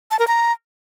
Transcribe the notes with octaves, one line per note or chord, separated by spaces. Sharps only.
A5
A#4
A#5